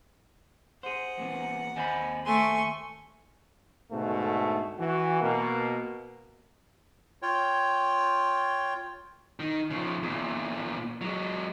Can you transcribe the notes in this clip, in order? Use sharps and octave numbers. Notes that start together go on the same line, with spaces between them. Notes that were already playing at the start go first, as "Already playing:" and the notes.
G#4 C5 F#5
E2 A#2 B3
D#2 A4 C5 D#5 G#5 B5
A3 G#5 C6 C#6
G#2 B2 D3 A3
E3 F#4
B2 A#3
F4 C#5 G5
D#3
C#3 F3
E2 A#2
F#3 G#3